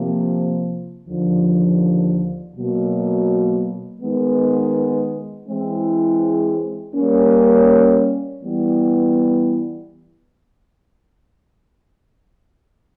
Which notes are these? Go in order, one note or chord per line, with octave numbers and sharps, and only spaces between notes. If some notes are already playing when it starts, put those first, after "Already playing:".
Already playing: C3 F3 A#3
D#2 D3 F3
B2 F#3 A#3
D#3 G#3 B3
E3 G#3 C4 E4 G#4
G3 A#3 C#4
E3 G3 B3